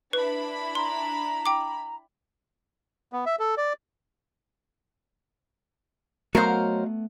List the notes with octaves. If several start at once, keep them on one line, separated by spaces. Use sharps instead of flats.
D4 E4 B4 B5
A#5 C6
G5 D6
B3
E5
A4
D5
F#3 A3 B3 F#4 A#4 C5 D#5 F5